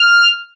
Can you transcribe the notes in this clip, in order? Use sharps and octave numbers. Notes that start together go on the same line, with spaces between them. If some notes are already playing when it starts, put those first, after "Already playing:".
Already playing: F6